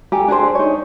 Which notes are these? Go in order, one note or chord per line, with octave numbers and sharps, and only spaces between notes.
G4 A4 G#5 A#5
D4 G#4 A4 C5
D#4 C#5